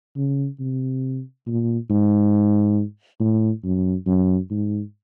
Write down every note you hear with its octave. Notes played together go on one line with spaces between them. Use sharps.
C#3
C3
A#2
G#2
A2
F#2
F#2
G#2